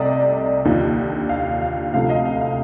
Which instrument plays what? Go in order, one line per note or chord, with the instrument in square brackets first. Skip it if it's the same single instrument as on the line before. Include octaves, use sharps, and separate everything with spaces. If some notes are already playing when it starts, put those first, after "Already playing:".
Already playing: [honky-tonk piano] C2 C3 A3 D5 D#5
D#2 D3 F3
F5
F5
D2 C3 F3 A3 F5
D#5
F5
F5